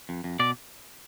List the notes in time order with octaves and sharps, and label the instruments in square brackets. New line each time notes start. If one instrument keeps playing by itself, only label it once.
[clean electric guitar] F2
F2
B2 D5